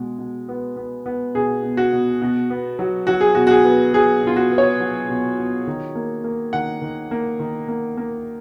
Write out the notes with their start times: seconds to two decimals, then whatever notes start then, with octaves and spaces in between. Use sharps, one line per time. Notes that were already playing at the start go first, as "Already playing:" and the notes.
Already playing: B2 G#3
0.19 B2
0.49 B3
0.76 B3
1.06 B3
1.35 B2 G#4
1.63 B2
1.77 F#4
1.93 B2
2.21 B2
2.50 B3
2.79 F#3
3.07 F#3 F#4
3.21 G#4
3.35 B2 F#4
3.47 F#4
3.51 G#4
3.65 B3
3.94 F#3 G#4
4.23 B2 F4
4.36 F#4
4.52 B3
4.58 C#5
4.80 F#3
5.09 B2
5.38 B2
5.67 D#3
5.95 A#3
6.24 A#3
6.53 D#3 F#5
6.82 D#3
7.11 A#3
7.39 D#3
7.68 A#3
7.97 A#3